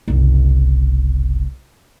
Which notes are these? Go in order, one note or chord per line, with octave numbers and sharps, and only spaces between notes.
F#1 C2